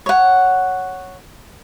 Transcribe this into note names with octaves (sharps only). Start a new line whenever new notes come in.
C#5 F#5